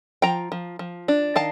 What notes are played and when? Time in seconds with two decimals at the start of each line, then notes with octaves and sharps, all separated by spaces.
0.22 F3 G5 A#5
0.52 F3
0.79 F3
1.08 D4
1.36 D#3 F5 A5